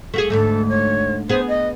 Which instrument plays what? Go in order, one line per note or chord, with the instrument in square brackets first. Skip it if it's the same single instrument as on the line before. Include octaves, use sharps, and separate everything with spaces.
[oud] A3 F#4 G#4
[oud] D2 G#2 A3 [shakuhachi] A4
[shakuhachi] C#5
[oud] B3 G#4 [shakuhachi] C5
[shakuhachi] D#5